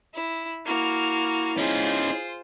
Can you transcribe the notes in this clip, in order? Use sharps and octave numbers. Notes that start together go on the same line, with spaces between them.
E4
A#3 E4 F#4 F6
C#4 D#4 F4 G#4 C5